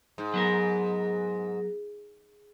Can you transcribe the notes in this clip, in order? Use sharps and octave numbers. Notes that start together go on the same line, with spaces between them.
G#2
F#3 B3 A#4